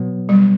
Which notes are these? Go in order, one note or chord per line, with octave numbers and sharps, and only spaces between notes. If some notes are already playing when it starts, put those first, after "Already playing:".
Already playing: B2 F#3 B3
G3